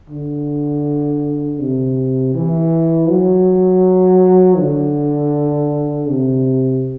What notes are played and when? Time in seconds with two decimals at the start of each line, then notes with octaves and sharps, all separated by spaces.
0.10 D3
1.60 C3
2.35 E3
3.09 F#3
4.58 D3
6.09 C3